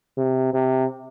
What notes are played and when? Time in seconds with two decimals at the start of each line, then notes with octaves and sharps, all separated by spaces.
0.18 C3
0.54 C3